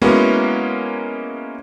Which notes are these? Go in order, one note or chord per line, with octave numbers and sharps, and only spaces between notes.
G#3 A#3 B3 C#4 E4 F#4